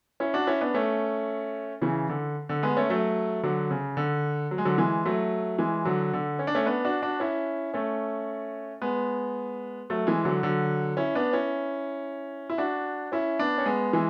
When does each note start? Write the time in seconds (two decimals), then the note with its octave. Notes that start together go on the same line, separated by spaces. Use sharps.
0.20 C#4 E4
0.34 D4 F#4
0.47 C#4 E4
0.61 B3 D4
0.74 A3 C#4
1.82 C#3 E3
2.09 D3
2.49 D3
2.63 G#3 B3
2.76 A3 C#4
2.90 F#3 A3
3.43 D3 F#3
3.71 C#3
3.97 D3
4.51 F#3
4.58 G#3
4.65 D3 F#3
4.78 E3 G#3
5.05 F#3 A3
5.58 E3 G#3
5.85 D3 F#3
6.13 D3
6.39 C#4
6.47 D4
6.55 A3 C#4
6.66 B3 D4
6.85 D4 F#4
7.02 D4 F#4
7.20 C#4 E4
7.74 A3 C#4
8.82 G#3 B3
9.90 F#3 A3
10.07 E3 G#3
10.25 D3 F#3
10.43 D3 F#3
10.97 C#4 E4
11.15 B3 D4
11.33 C#4 E4
12.50 E4
12.58 D4 F#4
13.12 C#4 E4
13.39 B3 D4
13.58 C#4
13.66 G#3 B3
13.93 E3 G#3